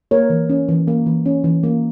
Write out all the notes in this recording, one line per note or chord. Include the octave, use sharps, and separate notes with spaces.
A#3 A#4 C#5
E3
C#4
E3
A#3
E3
C#4
E3
A#3